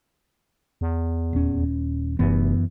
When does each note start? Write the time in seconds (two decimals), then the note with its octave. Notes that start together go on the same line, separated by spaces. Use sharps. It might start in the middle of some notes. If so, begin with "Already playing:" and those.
0.81 E2
1.33 D#1 C#4
2.19 F1 F#2 E3 B3